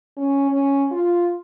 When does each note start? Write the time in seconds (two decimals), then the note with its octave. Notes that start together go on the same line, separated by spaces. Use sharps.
0.17 C#4
0.50 C#4
0.91 F4